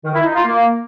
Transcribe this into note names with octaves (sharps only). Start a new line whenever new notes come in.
D#3
E4
D#4
F4
A#3